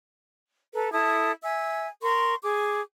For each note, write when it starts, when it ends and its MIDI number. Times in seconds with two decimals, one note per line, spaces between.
0.74 0.91 69
0.74 0.91 71
0.74 0.91 82
0.92 1.32 64
0.92 1.32 69
0.92 1.32 81
0.92 1.32 87
1.42 1.88 76
1.42 1.88 80
1.42 1.88 88
2.01 2.34 70
2.01 2.34 84
2.01 2.34 85
2.43 2.81 68
2.43 2.81 86